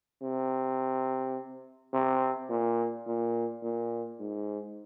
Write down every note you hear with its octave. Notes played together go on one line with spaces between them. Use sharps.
C3
C3
A#2
A#2
A#2
G#2